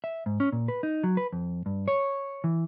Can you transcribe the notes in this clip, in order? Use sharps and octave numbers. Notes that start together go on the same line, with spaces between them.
E5
G#2
C#4
A#2
B4
D#4
F#3
B4
F2
G2
C#5
E3